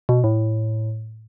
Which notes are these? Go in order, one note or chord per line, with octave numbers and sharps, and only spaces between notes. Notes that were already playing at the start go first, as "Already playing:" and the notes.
B2
A2